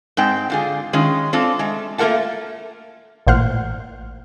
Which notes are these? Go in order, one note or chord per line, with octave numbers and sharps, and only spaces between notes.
G#2 G#3 C4 G5
D3 F4 G#4
D#3 G#3 C#4 F4
C4 D4 F4 A4
G#3 A3
A3 A#3 F4 A#4 F#5 A5
A1 A#2 C5 F#5 F6